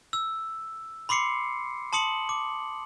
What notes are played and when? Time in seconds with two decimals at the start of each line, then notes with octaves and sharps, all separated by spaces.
0.13 E6
1.09 B5 C6 D6 C7 C#7
1.93 A5 C6 D#6 C#7 F#7
2.29 D6